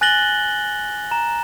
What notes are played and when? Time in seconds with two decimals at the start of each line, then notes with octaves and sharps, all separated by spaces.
0.01 G#5 F#6 A6 A#6 F#7 G7
1.11 A#5 E7